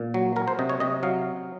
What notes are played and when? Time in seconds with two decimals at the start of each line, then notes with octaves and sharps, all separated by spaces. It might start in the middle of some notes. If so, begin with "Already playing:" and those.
Already playing: A#2
0.14 F#3
0.36 F#3 A#4
0.48 C5
0.59 C3 D#5
0.69 C#5
0.80 C3 D#5
1.03 F#3 F5